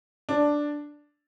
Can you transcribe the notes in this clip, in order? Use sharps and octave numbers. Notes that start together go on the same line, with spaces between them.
D4